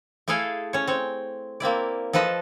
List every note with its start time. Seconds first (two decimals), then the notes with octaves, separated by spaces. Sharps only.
0.28 A3 E4 G#4 A4 F5 A5
0.73 C#4 C#5
0.87 C4 C#5
1.60 A#3 C4 E4 D5
2.13 F3 A4 B4 D#5 A5